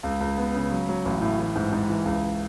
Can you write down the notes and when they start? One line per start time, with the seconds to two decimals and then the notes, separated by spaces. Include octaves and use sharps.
0.03 C#2
0.21 C#2
0.38 B3
0.55 C#3
0.72 F#3
0.89 F#3
1.05 A1
1.21 A2
1.39 E3
1.56 G#2
1.73 G#2
1.90 E3
2.05 C#2